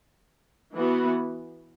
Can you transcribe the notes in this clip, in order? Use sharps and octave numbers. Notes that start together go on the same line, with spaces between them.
E3 B3 F#4